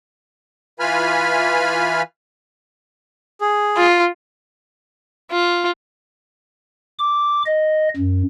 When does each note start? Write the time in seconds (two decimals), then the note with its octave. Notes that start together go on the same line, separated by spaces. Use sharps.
0.80 E3 F4 B4 G#5 B5 F6
3.41 G#4
3.77 F4
5.31 F4
6.99 D6
7.46 D#5
7.96 F#2